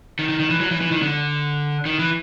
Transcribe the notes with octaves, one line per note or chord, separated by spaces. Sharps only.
D#3
D#3
D#3
E3
F#3
E3
E3
D#3
D3
D#3
E3